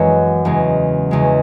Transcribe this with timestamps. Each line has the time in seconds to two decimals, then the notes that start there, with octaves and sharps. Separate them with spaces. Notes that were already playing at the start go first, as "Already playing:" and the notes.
Already playing: F#2 E3 G#3 C#4 F#4
0.45 E2 C#3 G#3
1.11 E2 C#3 G#3